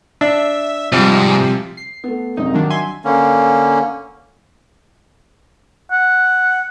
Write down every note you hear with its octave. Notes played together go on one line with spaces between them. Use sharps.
D4 E5
G#2 C3 F3 G3
C7
A3 B3
G#1 F#2 C3 D#4
D#3 F#3 D4
E5 G#5 C6
D3 A#3 C#4
F#5